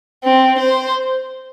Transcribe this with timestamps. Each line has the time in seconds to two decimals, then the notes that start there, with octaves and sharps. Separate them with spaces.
0.24 C4
0.59 C5